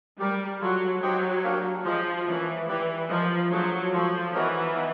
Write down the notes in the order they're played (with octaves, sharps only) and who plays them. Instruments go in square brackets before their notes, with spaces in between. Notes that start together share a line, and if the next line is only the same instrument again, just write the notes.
[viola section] G3 [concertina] G4 A#4 D5
[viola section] F#3 [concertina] F4 A4 C#5 F#5
[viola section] F#3 [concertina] D#4 G4 C5 D#5 G5
[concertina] A#3 D4 G4 A#4 C#5
[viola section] F3 [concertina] F4 G#4 C5 D#5
[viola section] E3 [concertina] A#3 C#4 E4
[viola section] E3 [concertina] G4 B4 D5
[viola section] F3 [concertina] F4 A#4 D#5
[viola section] F#3 [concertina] A3 D4 F4 G#4 C5
[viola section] F3 [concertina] F4 A4 C#5
[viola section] E3 [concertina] B3 D#4 F#4 A#4 C#5
[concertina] B3 D#4